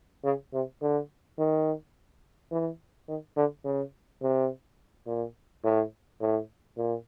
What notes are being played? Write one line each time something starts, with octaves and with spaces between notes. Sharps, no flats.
C#3
C3
D3
D#3
E3
D#3
D3
C#3
C3
A#2
A2
A2
A#2